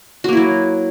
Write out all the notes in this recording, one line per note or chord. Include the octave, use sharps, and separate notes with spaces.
F#3 A#3 E4 F#4